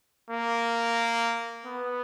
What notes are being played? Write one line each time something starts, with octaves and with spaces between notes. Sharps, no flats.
A#3
B3